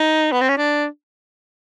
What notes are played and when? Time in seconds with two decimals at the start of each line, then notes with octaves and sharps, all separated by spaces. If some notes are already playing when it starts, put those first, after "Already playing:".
Already playing: D#4
0.32 B3
0.41 C4
0.49 C#4
0.57 D4